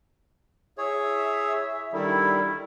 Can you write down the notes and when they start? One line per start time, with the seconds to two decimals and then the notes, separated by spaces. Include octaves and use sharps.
0.78 E4 G#4 C#5 E5
1.93 D3 D#3 G3 D#4 E4